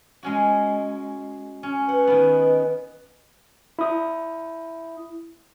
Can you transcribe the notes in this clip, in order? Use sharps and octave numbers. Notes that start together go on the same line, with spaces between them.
G#3 C#4 F#4
C#4
B4 F#5
D#3 B3
E4 D#6